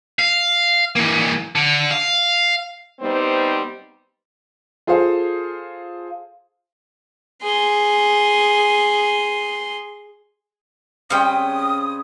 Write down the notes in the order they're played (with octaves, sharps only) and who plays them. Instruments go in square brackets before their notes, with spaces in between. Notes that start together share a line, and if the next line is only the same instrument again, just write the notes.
[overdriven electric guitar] F5
E3 A#3
D3
F5
[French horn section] G3 B3 C4 D#4 C5
[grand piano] F4 G#4 A4 C5 F5
[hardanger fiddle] G#4 C6
[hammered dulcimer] C#3 G3 C4 [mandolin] C#4 G5 [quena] D#6